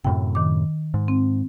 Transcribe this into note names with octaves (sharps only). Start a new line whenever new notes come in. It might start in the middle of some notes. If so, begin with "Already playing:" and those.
F#2 A2 C3 G5
D#3 D6
G#2
C4